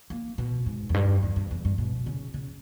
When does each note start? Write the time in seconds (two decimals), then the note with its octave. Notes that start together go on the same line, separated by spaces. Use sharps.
0.10 A#3
0.38 B2
0.66 G#2
0.89 E2
0.94 G2
1.23 E2
1.36 G2
1.51 E2
1.65 G2
1.78 B2
2.06 C#3
2.34 C#3